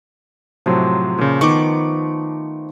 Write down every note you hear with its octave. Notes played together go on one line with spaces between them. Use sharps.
A2 C3 F3 F#3 C6
A#2 C#3
D#3 A3 B3 C#6 D6